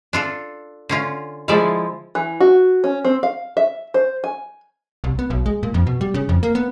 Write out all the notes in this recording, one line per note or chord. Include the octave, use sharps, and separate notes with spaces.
D4 F4 A4
D3 C#4 F4
F3 G#3 E4 D5 E5 F5
E3
F#4
C#4
C4
F5
E5
C5
G#5
C2
B3
B1
G#3
A#2
F2
B2
G3
C#3
F2
A#3
B3